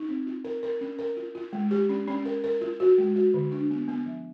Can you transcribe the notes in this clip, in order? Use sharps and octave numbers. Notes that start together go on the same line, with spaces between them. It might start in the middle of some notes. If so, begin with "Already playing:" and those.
Already playing: D#4
C4
F4
A#4
A#4
C#4
A#4
F4
F4
G#3
G4
C#4
C#4
A#4
A#4
F4
F#4
G#3
F#4
D3
D4
B3
B3
F3